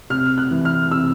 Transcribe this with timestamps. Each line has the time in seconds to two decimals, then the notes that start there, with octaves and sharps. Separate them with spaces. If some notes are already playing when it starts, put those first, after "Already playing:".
0.10 C3 F6
0.38 F#6
0.51 E3
0.65 F6
0.91 C3 E6